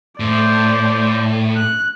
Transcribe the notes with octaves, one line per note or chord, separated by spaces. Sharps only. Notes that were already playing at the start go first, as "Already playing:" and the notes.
A2 C5 D5
F#6